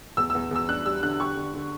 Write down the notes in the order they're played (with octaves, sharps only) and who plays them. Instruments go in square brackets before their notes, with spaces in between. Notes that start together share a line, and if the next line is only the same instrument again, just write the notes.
[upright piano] E2 [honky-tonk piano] E6
[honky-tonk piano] E6
[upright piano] E2
[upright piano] E2 [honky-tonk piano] E6
[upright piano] D4 [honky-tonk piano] F#6
[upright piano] G3 [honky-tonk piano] E6
[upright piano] D3 [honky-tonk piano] F#6
[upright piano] G4 [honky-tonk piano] C#6
[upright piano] D3
D3